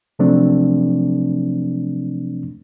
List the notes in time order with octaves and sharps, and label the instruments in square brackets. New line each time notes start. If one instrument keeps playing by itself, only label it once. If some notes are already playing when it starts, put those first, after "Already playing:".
[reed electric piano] C3 F3 F#3 A3 C4 D4